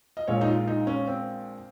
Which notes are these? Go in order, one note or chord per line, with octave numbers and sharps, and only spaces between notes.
D#5
A#1 A#2 G#3 C#5
D#4
F4
D#4
C#4
C4